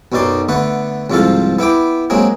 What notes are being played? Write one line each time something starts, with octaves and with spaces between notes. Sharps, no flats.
B1 F#2 B2 D#4 D5 C6
D3 A3 B3 F#5
C2 G#2 F3 F4 A4 F5
B3 E4 G5 D6
F#3 G#3 A#3 C4 G#4